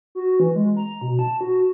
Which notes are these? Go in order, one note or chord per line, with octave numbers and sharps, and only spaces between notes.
F#4
E3
G#3
A#5
B2
A5
F#4